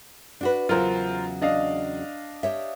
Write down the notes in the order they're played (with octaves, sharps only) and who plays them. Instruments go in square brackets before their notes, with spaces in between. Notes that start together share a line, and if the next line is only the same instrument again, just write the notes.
[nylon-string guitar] D4 F#4 B4
[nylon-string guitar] E2 C#3 F#3 [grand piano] F4 A#4 C5
[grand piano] D4 D#5 F5
[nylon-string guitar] G4 C#5 E5